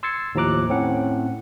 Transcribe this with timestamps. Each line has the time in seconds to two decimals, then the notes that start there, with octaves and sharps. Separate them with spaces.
0.03 C6 E6 G#6 A6 C7 C#7
0.35 D#2 A2 F3 A#5 D6 F#6
0.69 A2 C4 C#4 F#5